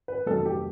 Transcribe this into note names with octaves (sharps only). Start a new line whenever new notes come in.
B4
F1 F2 C3 D#3 F#3 A4
G4